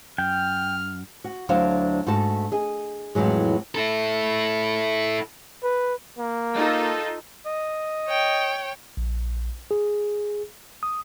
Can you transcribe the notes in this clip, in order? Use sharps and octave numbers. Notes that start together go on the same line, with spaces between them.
F#2 G5 F6
F#4
D2 F#3 D4 E4 C5 F5
G#2 A3 F#4 A5
G#4 D#5
F2 A2 E3 F#3 G#3
E4 A4
B4
A#3
D#4 F4 A4
D#5
C#5 G5
A#1
G#4
D#6